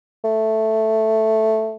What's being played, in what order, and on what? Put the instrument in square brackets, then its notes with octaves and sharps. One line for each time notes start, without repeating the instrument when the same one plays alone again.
[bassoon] A3